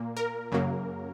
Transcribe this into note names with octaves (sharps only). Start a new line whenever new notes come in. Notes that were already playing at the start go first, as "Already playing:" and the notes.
Already playing: A#2 A#3
A#4
F#2 C#3 F#3 A#3